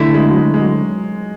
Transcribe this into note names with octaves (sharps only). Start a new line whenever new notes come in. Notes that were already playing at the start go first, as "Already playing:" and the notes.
Already playing: D3 A3 E4
G#3
F#3
G#3
G#3
F#3